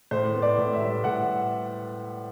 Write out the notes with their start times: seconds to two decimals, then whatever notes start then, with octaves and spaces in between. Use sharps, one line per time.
0.11 A2 C5
0.34 B3
0.42 D5
0.57 A2
0.73 E5
0.81 G3
1.04 A2 F#5